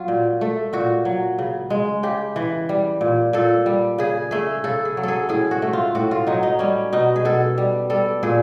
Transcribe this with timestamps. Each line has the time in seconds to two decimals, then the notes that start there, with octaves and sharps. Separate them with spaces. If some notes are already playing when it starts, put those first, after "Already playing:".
Already playing: F#3 F4
0.08 A#2
0.41 A3
0.73 A#2 F#4
1.05 F#3
1.39 C#3
1.70 G#3
2.03 C#3 G4
2.36 E3
2.69 G3
3.01 A#2
3.33 A#2 A4
3.66 G3
3.98 C#3 G#4
4.31 A3 G#4
4.64 C#3 A4
4.85 G#4
4.97 F#3
5.03 G#4 A4
5.29 A2 G#4
5.51 F#4
5.62 A3
5.73 F4
5.95 A2 F#4
6.11 F4
6.27 F#3 D#4
6.43 D#4
6.59 G3 C#4
6.93 B2 D#4
7.16 G#4
7.25 B2 A4
7.58 G3
7.90 G3 A4
8.23 A#2 G#4